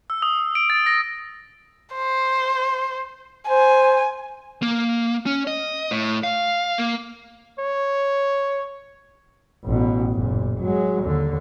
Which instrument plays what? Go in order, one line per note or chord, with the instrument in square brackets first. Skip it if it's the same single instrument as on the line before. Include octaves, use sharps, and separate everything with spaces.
[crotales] E6
D#6
D7
A6
A#6
[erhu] C5
[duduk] C5 [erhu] G#5
[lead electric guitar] A#3
C#4
D#5
A2
F5
A#3
[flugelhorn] C#5
[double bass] A1 B2
F#1 A#2
F#3 G#3
D#2 D3